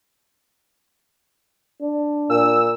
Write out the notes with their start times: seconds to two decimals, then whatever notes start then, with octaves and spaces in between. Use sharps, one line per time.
1.82 D4
2.30 A#2 E6